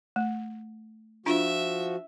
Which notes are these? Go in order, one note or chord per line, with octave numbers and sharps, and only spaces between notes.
A3
F3 D4 F4 F#4 E5